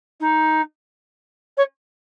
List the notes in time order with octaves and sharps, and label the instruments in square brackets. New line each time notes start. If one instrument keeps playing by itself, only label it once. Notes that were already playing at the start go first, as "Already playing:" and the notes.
[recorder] D#4
C#5